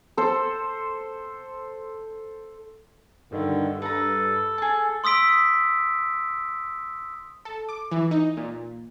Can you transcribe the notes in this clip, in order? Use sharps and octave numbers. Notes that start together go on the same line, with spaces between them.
A4 C5
G2 D3 D#3
A4 B4 A#5
G#4 A5
C6 D#6 E6 B6 D7
A4
D6
E3
D#4
A#2